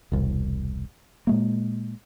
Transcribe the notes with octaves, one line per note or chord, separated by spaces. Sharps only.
E1 C2
A#2 G#3 A#3